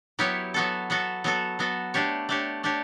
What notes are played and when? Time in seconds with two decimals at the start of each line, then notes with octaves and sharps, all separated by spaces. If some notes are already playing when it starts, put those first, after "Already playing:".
0.19 F#3 B3 E4 G4 C#5
0.54 F#3 B3 F#4 A4
0.90 F#3 B3 F#4 A4
1.24 F#3 B3 F#4 A4
1.59 F#3 B3 F#4 A4
1.94 A3 D4 G4 C#5
2.29 A3 D4 G4 C#5
2.63 A3 D4 G4 C#5